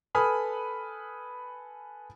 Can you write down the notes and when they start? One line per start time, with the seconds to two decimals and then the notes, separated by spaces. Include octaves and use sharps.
0.15 A4 B4 G#5 B5 D#6 F6